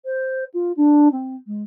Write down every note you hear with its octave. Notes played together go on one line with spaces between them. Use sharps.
C5
F4
D4
C4
G#3